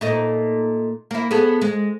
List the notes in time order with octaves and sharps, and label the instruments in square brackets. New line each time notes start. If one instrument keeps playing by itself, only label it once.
[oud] A#2 A3 D#4
A#3 E4
B3 G#4 A4
G#3